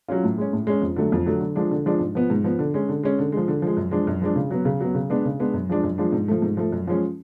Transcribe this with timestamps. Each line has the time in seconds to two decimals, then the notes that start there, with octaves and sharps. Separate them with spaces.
0.08 F#3 C#4 F4
0.24 A2
0.38 G#3 C#4
0.53 A2
0.67 G#3 C#4
0.82 F2
0.96 D3 F#3 A3
1.12 F2
1.26 D3 F#3 A3
1.41 D3
1.55 F3 G#3 D4
1.71 D3
1.86 F3 G#3 D4
2.00 G#2
2.15 F3 B3
2.30 G#2
2.44 F3 B3
2.59 D3
2.74 G#3 C#4
2.89 D3
3.03 G#3 C#4
3.19 D3
3.32 F3 G#3
3.48 D3
3.62 F3 G#3
3.77 F#2
3.91 F3 G#3 D4
4.07 F#2
4.22 F3 G#3 D4
4.36 C#3
4.51 F#3 B3
4.65 C#3
4.81 F#3 B3
4.95 C#3
5.10 G#3 B3 D4
5.25 C#3
5.39 G#3 B3 D4
5.54 F#2
5.69 F3 G#3 D4
5.83 F#2
5.98 F3 G#3 D4
6.13 G#2
6.28 F3 A3
6.42 G#2
6.57 F3 A3
6.72 F#2
6.87 F3 G#3 C#4